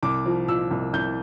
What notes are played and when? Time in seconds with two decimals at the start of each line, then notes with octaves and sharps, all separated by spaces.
0.03 C2 D6
0.26 F3
0.48 A#2 E6
0.71 C2
0.93 C2 G6